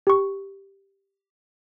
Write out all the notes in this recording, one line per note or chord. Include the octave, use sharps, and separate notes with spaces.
G4 C#6